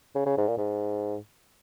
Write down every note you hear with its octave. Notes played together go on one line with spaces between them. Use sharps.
C#3
C#3
G#2
A#2
G#2